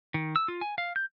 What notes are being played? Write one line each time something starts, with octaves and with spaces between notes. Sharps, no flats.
D#3
E6
F4
G#5
F5
G6